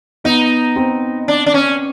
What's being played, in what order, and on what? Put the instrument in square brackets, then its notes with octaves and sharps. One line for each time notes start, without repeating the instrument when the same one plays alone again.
[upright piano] B3 [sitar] D#4
[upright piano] C4
[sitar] D4
D4
C#4